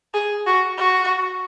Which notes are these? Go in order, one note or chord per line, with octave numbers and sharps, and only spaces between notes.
G#4
F#4
F#4